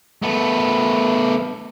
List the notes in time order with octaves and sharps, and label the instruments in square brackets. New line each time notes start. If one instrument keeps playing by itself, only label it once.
[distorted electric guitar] A3 B3